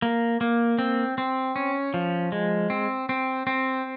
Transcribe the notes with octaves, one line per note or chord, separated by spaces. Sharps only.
A#3
A#3
C4
C4
C#4
F3
G#3
C4
C4
C4